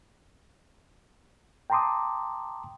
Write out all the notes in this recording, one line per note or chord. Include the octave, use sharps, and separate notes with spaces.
G5 A5 A#5 C6 D6 D#6